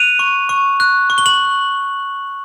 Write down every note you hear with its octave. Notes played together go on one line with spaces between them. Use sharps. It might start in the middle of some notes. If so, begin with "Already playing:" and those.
Already playing: F#6 D#7 F7
C#6
C#6
F#6
C#6
G7
F#7